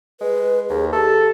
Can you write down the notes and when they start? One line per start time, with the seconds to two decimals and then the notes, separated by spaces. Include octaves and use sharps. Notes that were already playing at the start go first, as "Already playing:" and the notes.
0.21 G#3 B4
0.69 D#2 G#4
0.92 G4 A4